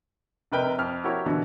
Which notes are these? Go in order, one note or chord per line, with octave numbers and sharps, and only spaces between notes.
F1 C3 A#4 B4 D#5 G5
F2 F6
E4 F#4 G4 A#4 C#5
B2 D3 E3